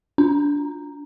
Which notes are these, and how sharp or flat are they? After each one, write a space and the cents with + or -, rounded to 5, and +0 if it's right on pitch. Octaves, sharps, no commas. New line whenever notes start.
D4 -20